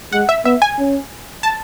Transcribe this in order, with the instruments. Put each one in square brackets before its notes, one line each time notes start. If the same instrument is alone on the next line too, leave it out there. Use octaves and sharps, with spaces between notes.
[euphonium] G#3 [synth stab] F#5
[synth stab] E5
[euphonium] B3 [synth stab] E5
[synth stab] G#5
[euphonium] C#4
[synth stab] A5